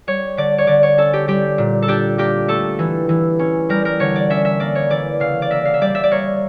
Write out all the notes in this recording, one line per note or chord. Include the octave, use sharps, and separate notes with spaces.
G3 C#5
D3 D5
C#5
D3 D5
C#5
C#4 A4
G4
G3 G4
A#2
A4
D4 G4
A#3 G4
A3 A4
E3
E3
C#4
G3 A#4
A#4
D3 C#5
D5
C#4 E5
E5
A#3 D5
C#5
E3 D5
C#3 F5
D5
A#3 E5
F5
E5
G3 D5
E5
D5
A#3 C#5